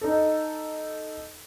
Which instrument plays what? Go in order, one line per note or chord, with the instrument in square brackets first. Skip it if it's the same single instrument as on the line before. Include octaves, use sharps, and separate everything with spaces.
[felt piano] D#4 A4